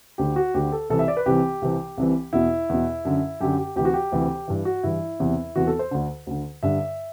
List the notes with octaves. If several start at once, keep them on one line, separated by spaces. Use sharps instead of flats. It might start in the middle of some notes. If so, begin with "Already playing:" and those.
D2 D3 G4
F#4
D2 D3 G4
A4
C2 C3 E3 A4
E5
D5
B4
C2 C3 E3 G4
C2 C3 E3
C2 C3 E3
E2 B2 E4
E2 B2
F#2 D3
F#2 D3 G4
G4
D2 C3 E3 G4
F#4
G4
D2 C3 E3
G2 E3
F#4
G2 E3 E4
E2 C3 E3
E2 C3 E3 F#4
A4
C5
D2 D3
D2 D3
G2 D3 E5